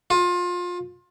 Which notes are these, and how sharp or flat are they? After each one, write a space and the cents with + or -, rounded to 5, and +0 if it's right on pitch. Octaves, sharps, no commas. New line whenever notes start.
F4 +25